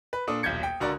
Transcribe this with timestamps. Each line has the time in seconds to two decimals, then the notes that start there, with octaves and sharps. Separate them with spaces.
0.13 B4
0.27 A#2 D4 A4 D#6
0.43 D#1 B1 G6 G#6 C#7
0.63 G5
0.80 C#2 D3 F#4 A#4 D5